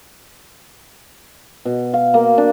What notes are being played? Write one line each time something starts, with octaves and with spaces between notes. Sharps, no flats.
B2
F5
A#3
D4